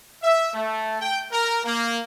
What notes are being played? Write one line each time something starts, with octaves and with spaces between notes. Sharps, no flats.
E5
A3
G5
A#4
A#3